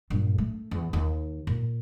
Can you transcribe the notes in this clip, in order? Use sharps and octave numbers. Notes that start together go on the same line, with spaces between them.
G2 A#2
A3
E2
D#2
A#2